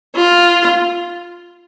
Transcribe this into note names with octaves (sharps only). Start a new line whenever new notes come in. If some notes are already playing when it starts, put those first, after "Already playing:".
F4